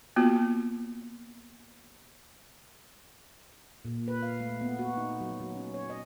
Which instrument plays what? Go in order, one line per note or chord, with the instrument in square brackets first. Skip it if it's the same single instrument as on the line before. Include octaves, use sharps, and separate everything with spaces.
[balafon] A#3 B3 F4 F#4
[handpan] A#2
B4
F5
A3
B3
F#4
D#4
F#3
F#3
C#4
C#5
D#5